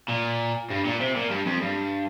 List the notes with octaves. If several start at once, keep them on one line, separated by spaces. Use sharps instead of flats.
A#2
G2
A#2
C3
A#2
G2
F2
G2